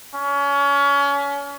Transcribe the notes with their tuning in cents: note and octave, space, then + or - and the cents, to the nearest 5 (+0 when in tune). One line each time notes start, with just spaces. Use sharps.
C#4 +30